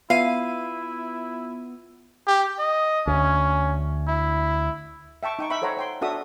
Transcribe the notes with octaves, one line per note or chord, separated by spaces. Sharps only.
B3 E4 F4 E5 F5 D#7
G4
D#5
D2 C#4
E4
E5 G5 A5 C#6
D#4 G5 C#6
E5 G5 B5 C#6
A4 C5 C#5 F#5 A#5
C#5 G5 C6
D4 F#4 A4 E5 D#6